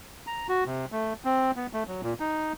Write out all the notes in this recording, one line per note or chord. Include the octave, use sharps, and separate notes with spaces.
A#5
F#4
C3
A3
C4
B3
A3
F#3
A#2
D#4